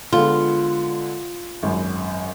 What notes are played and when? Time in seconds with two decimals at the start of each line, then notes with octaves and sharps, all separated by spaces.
0.13 D3 G#3 B3 F4
1.63 G#1 F#2